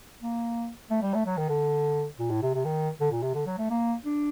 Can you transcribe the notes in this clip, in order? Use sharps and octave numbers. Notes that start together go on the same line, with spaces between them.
A#3
A3
G3
A3
F#3
D#3
D3
A#2
A2
C3
C3
D#3
D3
A#2
C3
D3
F#3
A3
A#3
D4